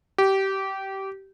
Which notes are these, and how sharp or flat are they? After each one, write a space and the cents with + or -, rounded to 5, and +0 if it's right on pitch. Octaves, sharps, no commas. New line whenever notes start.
G4 -20